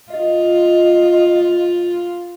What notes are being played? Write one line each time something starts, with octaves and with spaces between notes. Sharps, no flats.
F4 D#5